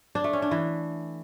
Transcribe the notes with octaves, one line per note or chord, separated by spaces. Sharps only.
D4
A3
C#4
D4
E3